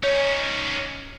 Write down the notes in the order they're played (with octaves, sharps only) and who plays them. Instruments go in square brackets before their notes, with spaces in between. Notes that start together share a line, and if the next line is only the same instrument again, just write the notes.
[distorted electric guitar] C#4 D#4 [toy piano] C#5